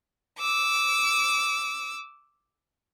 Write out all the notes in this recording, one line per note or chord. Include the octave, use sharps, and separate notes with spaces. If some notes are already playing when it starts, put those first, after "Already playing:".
D6 E6